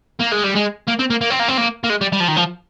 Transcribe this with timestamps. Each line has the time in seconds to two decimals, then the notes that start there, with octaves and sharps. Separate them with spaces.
0.20 A#3
0.31 G#3
0.43 G3
0.55 G#3
0.88 A#3
0.99 C4
1.10 A#3
1.21 A#3
1.31 C4
1.40 A#3
1.48 C4
1.58 A#3
1.84 A#3
1.90 G#3
2.01 G3
2.13 G3
2.20 F3
2.28 D#3
2.36 F3